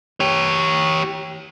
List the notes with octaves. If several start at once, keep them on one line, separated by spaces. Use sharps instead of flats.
G4 C#5